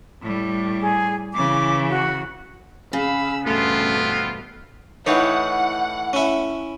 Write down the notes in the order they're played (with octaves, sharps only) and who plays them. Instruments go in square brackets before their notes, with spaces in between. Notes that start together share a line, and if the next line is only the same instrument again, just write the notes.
[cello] A2 G3
[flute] G#4
[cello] C#3 E3 [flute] D6
[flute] F#4
[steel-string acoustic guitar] C#3 [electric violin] G#4 F5 [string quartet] B5 E6
[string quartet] E2 G2 B2 [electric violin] A3 [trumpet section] B3 C4 F4
[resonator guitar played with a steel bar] A2 D#4 C#5 [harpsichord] E3 [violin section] F#5
[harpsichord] C#4 E4